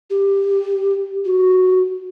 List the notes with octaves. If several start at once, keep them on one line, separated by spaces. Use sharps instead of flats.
G4
F#4